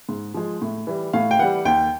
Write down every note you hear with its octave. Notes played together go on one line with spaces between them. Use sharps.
G#2
F3 G#3
A2
E3 G3
A2 F5
G5
E3 G3 F#5
D#2 G5